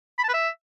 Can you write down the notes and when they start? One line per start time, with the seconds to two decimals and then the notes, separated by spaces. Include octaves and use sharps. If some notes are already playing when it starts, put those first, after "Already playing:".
0.19 B5
0.24 A5
0.29 B4
0.34 E5